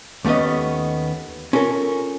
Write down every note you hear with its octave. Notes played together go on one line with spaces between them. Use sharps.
D#2 A3 B3 C#4 D#5
C#4 F4 A4 A#4